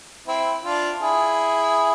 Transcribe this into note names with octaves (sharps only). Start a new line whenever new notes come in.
C4 E4
D4 F4
E4 G#4